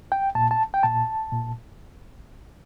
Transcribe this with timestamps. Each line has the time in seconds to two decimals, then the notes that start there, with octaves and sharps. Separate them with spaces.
0.12 G5
0.35 A#2 A5
0.51 A5
0.74 G5
0.83 A#2 A5
1.32 A#2